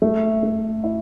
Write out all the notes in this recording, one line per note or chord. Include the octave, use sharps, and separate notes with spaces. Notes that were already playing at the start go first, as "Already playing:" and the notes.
A3
A3
E4